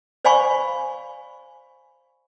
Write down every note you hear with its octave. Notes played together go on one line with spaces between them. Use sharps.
C5 D5 F5 G#5 B5 C#6